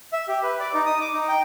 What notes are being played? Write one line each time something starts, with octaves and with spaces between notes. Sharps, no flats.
E5
G4
B4
D5
D#4
D#6
D6
D#4
G5